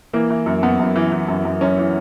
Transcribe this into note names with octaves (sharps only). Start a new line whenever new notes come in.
E3 A#3
E3
F#2
F#2 B3
F#2
E3
E3
F#2
F#2
F#2 C#4
E3